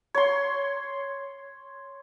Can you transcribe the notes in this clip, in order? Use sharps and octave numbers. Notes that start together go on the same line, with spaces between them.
C#5 C6